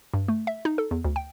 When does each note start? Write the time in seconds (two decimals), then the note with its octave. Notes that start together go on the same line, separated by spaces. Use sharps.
0.14 G2
0.28 A3
0.47 E5
0.65 D#4
0.78 A4
0.91 E2
1.05 D2
1.16 G5